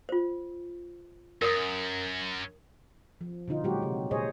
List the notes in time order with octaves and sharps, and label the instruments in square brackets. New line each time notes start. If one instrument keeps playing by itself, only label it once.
[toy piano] F4 C5
[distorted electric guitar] F#2 [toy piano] A#4 C#5 D#6
[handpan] F3
B2 D3 D#4 F4
A#2 F#3 G#3 F#4 G4
C3
A#2 G#4 C5 C#5 D#5